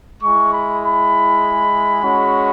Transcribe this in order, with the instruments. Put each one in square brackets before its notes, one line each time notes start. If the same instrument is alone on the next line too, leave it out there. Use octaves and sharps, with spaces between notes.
[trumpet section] G#3 E4 C#6
B5
B5
G#3 C#4 F#4